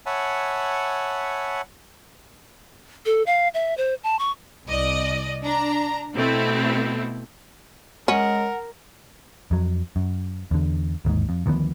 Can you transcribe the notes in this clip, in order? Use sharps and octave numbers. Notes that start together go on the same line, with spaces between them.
C#5 E5 F#5 G#5 A5 B5
A4
F5
E5
C5
A5
C#6
C2 D5 D#5
D4 A#5
B2 A3 C4 E4
G#3 C#4 A#4 F#5
F2 F#3
F#2
E2 D3
G1 D#2 G#2
F2
D2 D#3 F3 B3